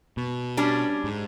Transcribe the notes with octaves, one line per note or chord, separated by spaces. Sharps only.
B2
G3 C#4 D4
G#2